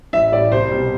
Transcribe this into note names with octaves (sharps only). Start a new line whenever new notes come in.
A1 E5
A2 G3 D5
C2 C5
B2 G3